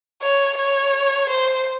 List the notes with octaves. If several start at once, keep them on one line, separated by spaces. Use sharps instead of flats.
C#5
C#5
C5